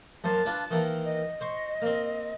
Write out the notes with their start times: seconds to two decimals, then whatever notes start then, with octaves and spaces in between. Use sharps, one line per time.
0.24 F#2 A#3 C5 A5
0.46 D4 F4 B4
0.71 D#3 E3 A#3
1.05 D#5
1.41 C5 C#6
1.82 A#3 C4